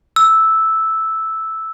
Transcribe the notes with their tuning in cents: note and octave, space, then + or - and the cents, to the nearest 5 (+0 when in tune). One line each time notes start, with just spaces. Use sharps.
E6 -5